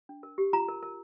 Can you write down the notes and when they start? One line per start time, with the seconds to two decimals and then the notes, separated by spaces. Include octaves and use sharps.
0.09 D4
0.23 A#4
0.38 G4
0.53 F4 A#5
0.68 A#4
0.83 A#4